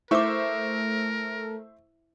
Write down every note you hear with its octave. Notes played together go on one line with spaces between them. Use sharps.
A3 E4 A#4 C5 E5 C#6 D6